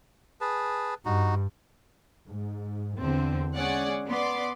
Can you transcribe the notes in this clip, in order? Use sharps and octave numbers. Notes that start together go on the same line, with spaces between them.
G#4 B4 A5
G2 D#4 F#4
G#2
E2 D3 C4
G#3 C#4 G#4 D5 F#5
B3 D5 C6 D6